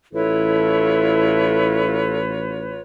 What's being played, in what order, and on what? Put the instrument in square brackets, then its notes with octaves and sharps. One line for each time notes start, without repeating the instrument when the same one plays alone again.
[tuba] A1 [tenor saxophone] E4 [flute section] F4 B4 C#5 [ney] A4